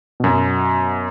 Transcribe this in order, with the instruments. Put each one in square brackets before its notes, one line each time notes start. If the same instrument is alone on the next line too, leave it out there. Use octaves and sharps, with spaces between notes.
[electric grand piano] F#2 B2